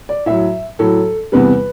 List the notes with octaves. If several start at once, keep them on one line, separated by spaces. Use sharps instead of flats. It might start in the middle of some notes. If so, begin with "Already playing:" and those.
D5
A2 F#3 E5
A2 F#3 A4
E2 C3 G3 B4